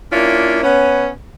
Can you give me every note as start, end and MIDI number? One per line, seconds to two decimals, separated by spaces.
0.12 0.61 58
0.12 0.61 61
0.12 0.61 62
0.12 0.61 64
0.12 0.61 65
0.62 1.10 59
0.62 1.10 61